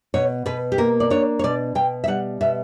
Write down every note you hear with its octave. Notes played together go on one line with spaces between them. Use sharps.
B2 C#5
B2 B4
G4
A#3 A#4
D5
D4 C#5
C#5
B2 D5
B2 G5
E5
G3 F#5
B2 E5